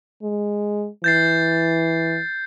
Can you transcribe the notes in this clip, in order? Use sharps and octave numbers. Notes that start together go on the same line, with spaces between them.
G#3
E3 G6 A6 C7